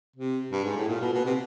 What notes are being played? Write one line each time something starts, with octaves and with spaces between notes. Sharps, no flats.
C3
G2
G#2
A2
A#2
B2
B2
C3